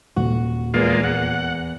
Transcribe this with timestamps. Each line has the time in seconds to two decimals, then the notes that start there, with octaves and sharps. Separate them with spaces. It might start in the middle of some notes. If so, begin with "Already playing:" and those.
0.16 D#1 F#4
0.74 E2 G#3 A#3 F4
1.04 F#5